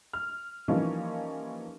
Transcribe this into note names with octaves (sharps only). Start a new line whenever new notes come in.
F6
E3 F3 G3 A#3 C#4 D#4